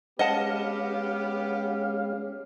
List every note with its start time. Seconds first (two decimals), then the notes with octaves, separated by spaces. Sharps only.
0.19 G#3 B3 C#4 G4 D#5 F5 F#5 A5